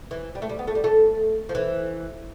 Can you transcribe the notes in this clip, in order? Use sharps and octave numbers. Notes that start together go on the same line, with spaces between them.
E3
G3
A3
G3
B3
A3
G3
A3
F3
E3